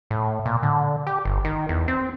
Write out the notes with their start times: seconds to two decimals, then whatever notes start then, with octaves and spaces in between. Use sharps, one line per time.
0.11 A2
0.46 A#2
0.63 D3
1.07 G4
1.25 G1
1.45 D#3
1.69 E2
1.88 C4